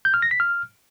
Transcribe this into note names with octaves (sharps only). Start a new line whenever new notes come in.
G6
F6
A#6
B6
F6